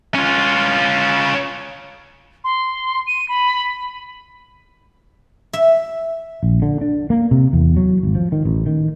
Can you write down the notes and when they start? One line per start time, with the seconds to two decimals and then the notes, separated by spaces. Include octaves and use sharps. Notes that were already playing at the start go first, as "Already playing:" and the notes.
0.15 C#4 F4
2.44 C6
3.07 D#7
3.28 B5
5.53 E5
6.43 A#1
6.62 D3
6.81 D4
7.10 A#3
7.31 C3
7.53 E2
7.77 F#3
8.03 G#1
8.15 F3
8.32 D#3
8.45 A1
8.66 D#3